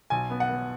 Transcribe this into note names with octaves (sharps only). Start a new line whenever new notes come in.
B1 G#5
B3
F#5
B3